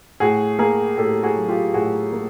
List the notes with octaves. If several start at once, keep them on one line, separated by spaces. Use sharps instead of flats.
A2 F#4 G#4
A#3 G#4 A#4
A2 G4 A4
F#4 G#4
F#3
F4 G4
A2 F#4 G#4
A#3